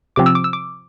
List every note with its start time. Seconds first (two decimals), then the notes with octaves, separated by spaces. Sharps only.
0.16 C3 F3 C4 D6
0.26 E6
0.35 D6
0.44 E6
0.53 D6